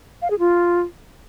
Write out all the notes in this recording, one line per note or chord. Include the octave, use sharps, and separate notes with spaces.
F5
G#4
F4